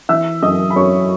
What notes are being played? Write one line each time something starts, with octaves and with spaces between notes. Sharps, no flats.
E3 E5 E6
F#2 D#5 D#6
B5
F#2 C#5 C#6